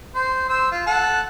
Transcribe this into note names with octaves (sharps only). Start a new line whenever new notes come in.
C5
C5 E6
F4
A4 F#5